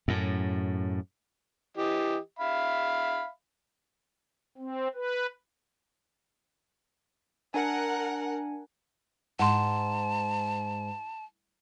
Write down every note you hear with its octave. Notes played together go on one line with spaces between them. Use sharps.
F#2 A2
E3 G4 D#5
E5 F5 B5
C4
B4
D4 A#4 F#5 G#5
G#2 F#5 A5 C6